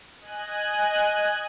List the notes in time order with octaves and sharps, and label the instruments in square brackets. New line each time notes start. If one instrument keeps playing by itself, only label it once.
[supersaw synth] D#5 G#5 F#6